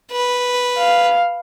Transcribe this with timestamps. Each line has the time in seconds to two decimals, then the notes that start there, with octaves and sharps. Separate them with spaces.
0.12 B4
0.78 F5